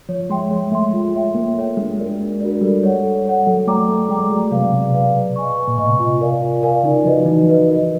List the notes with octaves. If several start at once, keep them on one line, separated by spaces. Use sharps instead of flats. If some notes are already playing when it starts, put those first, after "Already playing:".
F3 C#5
G#3 E5 G5 C6
G#3 C#5
A3 E5 G5 C6
F4
A4 C#5 E5 G5
A#3 F4
A4 C#5 E5 G5
G#3 D4
F#4 A#4 D5
D4
F#4 A#4 D5
G3 A4
C#5 F#5
A4
C#5 F#5
F#3 A4
A3 D5 G5 A#5 D6
A3 A4
G#3 D5 G5 A#5 D6
F#3 G#4
C3 B4 D5 F5
B2 G#4
B4 D5 F5
B4
D#5 G#5 C#6
B4
A#2
A2 D#5 G#5 C#6
C3
F4
A#4 D5 F5 G#5
F4
A#4 D5 F5 G#5
C#3 D#4
F3 F#4 B4 D#5
E3 D#4
F#4 B4 D#5
A#4